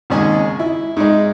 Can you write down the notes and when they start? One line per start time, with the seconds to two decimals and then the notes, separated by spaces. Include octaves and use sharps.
0.10 G#1 D#2 C#3 G#3 G#4 D#5
0.59 E4
0.97 G#2 G#3